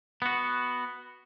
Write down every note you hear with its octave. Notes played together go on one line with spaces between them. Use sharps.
B3 F#4